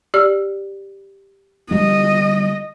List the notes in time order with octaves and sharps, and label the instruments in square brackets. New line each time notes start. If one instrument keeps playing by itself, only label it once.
[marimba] G4 D5 E6
[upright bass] D3 G3 [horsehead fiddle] D#5